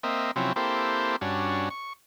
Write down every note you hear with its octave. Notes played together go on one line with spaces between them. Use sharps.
A#3 C4 D#5 E5
C3 F3 F#3 C4 C#4 E4
A#3 C4 E4 G4 A4 C5
G2 C#4 D4 F#4
C#6